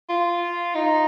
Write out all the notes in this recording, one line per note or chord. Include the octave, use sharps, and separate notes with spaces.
F4
D#4